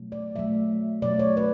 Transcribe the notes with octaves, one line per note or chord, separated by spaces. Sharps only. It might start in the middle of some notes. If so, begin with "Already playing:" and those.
Already playing: B2 F#3 A3
D5
B2 F#3 A3 E5
B2 F#3 A3 D5
C#5
B4